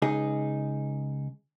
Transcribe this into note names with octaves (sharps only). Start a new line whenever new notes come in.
C#2 D#4 G#4